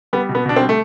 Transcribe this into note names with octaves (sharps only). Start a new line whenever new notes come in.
G3 B3
B2
B3
B2 D4
C4
G3
A3